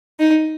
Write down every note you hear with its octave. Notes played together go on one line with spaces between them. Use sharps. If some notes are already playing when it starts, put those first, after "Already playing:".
D#4